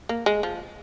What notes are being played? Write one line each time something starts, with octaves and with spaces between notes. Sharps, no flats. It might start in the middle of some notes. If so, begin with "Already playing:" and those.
A#3
G#3
F3